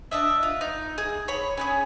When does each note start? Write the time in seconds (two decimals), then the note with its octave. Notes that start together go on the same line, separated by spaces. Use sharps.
0.11 D4 D#5 E5
0.43 F4
0.61 D#4
0.98 G#4
1.28 C#5 B5
1.57 C#4 D#4 G#4